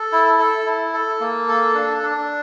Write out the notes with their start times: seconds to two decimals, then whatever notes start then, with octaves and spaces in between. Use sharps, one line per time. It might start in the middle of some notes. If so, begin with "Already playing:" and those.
Already playing: A4
0.12 E4
0.39 A4
0.66 E4
0.94 A4
1.20 A#3
1.48 A4
1.75 D4
2.03 D4